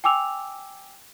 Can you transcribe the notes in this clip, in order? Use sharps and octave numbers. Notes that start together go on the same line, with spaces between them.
G5 G#5 D6 E6 F7